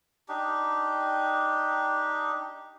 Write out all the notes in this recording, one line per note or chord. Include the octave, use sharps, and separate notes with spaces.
D4 D#4 G4